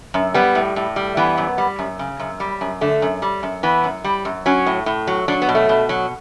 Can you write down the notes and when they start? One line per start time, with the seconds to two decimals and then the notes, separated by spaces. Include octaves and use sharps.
0.14 F#2
0.34 G3 B3
0.55 A2
0.76 A2
0.96 G3
1.17 E3 B3
1.38 F#2
1.58 G3
1.79 F#2
1.99 C#3
2.19 F#2
2.40 G3
2.61 F#2
2.81 D3 A3
3.02 F#2
3.22 G3
3.43 F#2
3.63 E3 B3
3.84 F#2
4.04 G3
4.25 F#2
4.46 F#3 C#4
4.66 A2
4.86 A2
5.07 F#3
5.28 F#3 D4
5.42 B3
5.49 B2
5.55 A3
5.69 B2
5.89 F#3